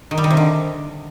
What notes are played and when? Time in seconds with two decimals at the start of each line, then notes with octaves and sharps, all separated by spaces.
0.11 D#3
0.18 G3
0.24 D#3
0.30 C3
0.37 D3